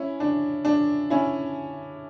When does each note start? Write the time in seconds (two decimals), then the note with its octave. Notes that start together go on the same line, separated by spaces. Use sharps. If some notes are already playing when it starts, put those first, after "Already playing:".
Already playing: C#4 E4
0.20 D4
0.65 D4
1.10 C#4 E4